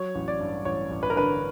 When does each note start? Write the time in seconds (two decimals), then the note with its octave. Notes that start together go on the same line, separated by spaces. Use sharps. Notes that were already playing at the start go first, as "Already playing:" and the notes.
Already playing: F#3 C#5
0.15 A1
0.28 D5
0.40 G2
0.65 A1 C#5
0.90 A1
1.03 B4
1.10 A#4
1.16 D3 B4